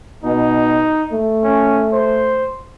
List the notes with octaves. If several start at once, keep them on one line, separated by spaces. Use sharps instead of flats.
B2 D#4
A3
C#4
C5